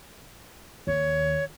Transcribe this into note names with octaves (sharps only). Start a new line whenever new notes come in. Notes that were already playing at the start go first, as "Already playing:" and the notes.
D#2 C#5